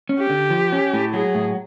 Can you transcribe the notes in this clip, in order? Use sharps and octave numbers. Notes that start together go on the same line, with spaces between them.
C#4
G4
D3
F3
C#4
A2
F#3 G#4
A2